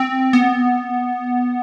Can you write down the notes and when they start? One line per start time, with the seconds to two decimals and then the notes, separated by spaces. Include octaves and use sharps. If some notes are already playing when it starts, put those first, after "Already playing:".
Already playing: C4
0.33 B3